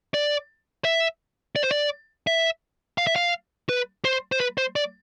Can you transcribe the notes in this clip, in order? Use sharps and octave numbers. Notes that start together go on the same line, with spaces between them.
D5
E5
D5
C5
D5
E5
F5
E5
F5
B4
C5
C5
B4
C5
D5